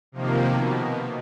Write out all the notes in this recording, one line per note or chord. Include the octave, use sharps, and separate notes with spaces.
C3 D#3 F3 A#3
B2